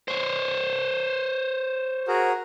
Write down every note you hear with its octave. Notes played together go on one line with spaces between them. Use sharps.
C5 C#5
F#4 G#4 A#4